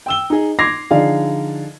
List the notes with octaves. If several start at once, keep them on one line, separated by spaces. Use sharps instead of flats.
G5 E6 G7
D#4 G#4
C6 D6 G#6 A#6 C7 F7
D3 F3 D#4 G#4 D5 F5